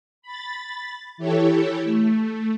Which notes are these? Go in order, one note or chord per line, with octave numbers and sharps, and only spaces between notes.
B5 A6
E3 E4 G4 A4 C#5
A3